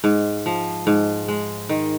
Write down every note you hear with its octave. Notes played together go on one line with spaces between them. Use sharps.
G#2
F3
G#2
G#3
D#3